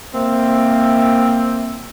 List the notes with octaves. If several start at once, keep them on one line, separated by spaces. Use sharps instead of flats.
A#3 C4 E5